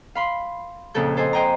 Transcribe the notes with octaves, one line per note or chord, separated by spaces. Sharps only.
F5 B5 C6
F2 A#2 C#3 A4 G6
A4 C5 D#5 G#5
C5 D#5 G5 G#5 A#5